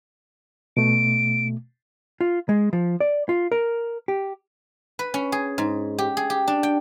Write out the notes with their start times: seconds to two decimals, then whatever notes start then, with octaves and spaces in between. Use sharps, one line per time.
0.77 B2 A3 D7
2.21 F4
2.49 G#3
2.73 F3
3.00 D5
3.29 F4
3.52 A#4
4.08 G4
4.99 B4
5.14 C#4
5.32 G#4
5.58 G#2
5.98 G4
6.17 G#4
6.30 G4
6.48 D4
6.63 G5